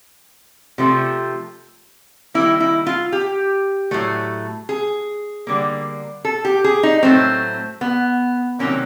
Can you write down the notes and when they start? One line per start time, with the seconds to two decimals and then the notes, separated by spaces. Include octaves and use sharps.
0.78 C3 F3 A3
2.34 D#3 G3 A#3 E4
2.60 E4
2.87 F4
3.12 G4
3.91 A2 F#3 A3
4.69 G#4
5.47 D3 G3 A#3
6.25 A4
6.45 G4
6.64 G#4
6.83 D#4
7.03 A2 F#3 A3 C4
7.81 B3
8.59 C3 D#3 F#3 A#3 C#4